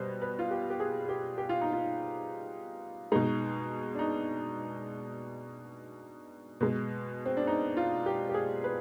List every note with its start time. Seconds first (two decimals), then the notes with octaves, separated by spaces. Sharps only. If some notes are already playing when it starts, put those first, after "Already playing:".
Already playing: B2 G3 C5
0.22 B4
0.39 F4
0.51 G4
0.70 G4
0.80 G#4
1.09 G4
1.38 G4
1.49 F4
1.61 D#4
1.73 F4
3.12 B2 G#3 D#4
3.95 D4
3.99 D#4
6.60 B2 G#3
7.26 C4
7.37 D4
7.47 D#4
7.77 F4
8.06 G4
8.29 G4
8.34 G#4
8.64 B4